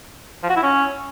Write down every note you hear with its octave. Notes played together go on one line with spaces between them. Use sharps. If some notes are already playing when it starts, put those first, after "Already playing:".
F3
F#4
E4
C#4